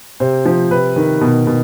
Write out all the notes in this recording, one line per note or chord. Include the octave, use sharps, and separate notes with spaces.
C3 C5
F3
C3 B4
D#3
B2
B2